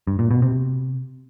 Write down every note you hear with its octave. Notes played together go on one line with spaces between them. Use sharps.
G2
A#2
B2
C3